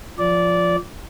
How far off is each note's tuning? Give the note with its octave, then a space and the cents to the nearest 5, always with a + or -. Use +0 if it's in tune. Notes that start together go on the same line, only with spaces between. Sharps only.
F3 +0 D5 -15